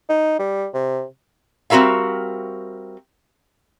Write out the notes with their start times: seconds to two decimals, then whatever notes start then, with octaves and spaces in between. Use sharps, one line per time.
0.09 D#4
0.39 G3
0.74 C3
1.70 G3 C4 F#4 A#4 E5 F5